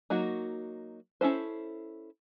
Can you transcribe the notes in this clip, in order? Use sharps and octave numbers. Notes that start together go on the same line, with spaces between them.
F#3 A#3 D#4 F#4
C#4 E4 A4 C5